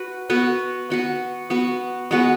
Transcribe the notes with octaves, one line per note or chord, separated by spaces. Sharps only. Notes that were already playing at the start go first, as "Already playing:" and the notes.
Already playing: F#4 B4
B3 F#4 B4
B3 F#4 B4
B3 F#4 B4
G#3 B3 F#4 B4